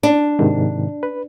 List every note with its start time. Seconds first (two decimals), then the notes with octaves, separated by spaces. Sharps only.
0.03 D4
0.39 G#2 C3 D#3
1.03 B4